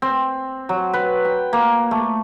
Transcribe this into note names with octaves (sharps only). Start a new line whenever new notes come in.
C4
F#3
B4
G5
A#3
A3